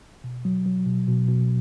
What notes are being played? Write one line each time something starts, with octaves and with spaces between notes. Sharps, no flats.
B2
F#3
F#3
B2
B2
B2